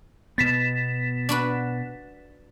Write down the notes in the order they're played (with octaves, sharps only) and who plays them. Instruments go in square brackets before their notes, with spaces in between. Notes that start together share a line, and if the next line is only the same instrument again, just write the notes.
[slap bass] B2 B3 [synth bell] A6 B6 E7
[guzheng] D4 F#4 B4